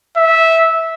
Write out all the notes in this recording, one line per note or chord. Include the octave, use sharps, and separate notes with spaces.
E5